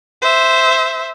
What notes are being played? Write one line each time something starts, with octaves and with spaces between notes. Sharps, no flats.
C5 E5